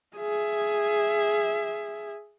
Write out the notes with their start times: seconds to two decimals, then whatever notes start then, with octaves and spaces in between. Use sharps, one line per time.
0.17 G#4 E5